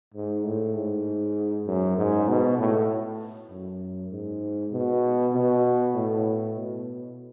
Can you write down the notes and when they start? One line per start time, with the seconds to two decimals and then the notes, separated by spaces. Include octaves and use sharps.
0.14 G#2
0.45 A2
0.75 G#2
1.67 F#2
1.98 G#2
2.28 B2
2.59 A2
3.50 F#2
4.11 G#2
4.72 B2
5.33 B2
5.95 A2
6.55 B2